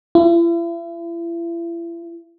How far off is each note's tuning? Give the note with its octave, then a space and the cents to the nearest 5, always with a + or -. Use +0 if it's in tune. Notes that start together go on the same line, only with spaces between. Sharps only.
E4 +40